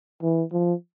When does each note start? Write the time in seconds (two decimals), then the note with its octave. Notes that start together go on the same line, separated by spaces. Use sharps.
0.23 E3
0.53 F3